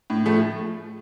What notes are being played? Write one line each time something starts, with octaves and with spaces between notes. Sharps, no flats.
A2
F3 A3